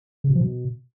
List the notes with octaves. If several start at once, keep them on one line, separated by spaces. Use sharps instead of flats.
C#3
B2
F3
B2